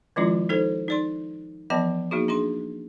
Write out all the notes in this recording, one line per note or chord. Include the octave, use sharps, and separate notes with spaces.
D#3 F3 G#3 C#4 E4 F4
D#4 A4 C5
D#4 D5 C6
E3 F3 B3 D#5 A5
A#3 D#4 F#4 G#4
D4 G#4 C6